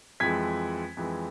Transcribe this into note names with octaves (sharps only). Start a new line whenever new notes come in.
F2 E3 G#3 G#6 B6
F2 E3 G#3